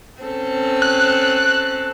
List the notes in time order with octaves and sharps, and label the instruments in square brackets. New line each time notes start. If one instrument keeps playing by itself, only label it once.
[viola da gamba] C4 C#4 A4
[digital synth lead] F#6